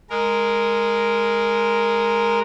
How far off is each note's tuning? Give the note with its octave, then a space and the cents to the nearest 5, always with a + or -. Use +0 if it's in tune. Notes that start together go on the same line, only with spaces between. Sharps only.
G#3 +0 A#4 +0